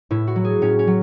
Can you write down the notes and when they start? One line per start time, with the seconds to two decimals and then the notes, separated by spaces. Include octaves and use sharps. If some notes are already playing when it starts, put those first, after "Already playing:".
0.11 A2 E4
0.27 F#4
0.36 F#3
0.44 G#4
0.62 A2 C#4
0.79 C#4
0.87 F#3